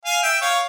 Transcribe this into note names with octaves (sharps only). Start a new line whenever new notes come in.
F5 G#5
E5 G5
C#5 F5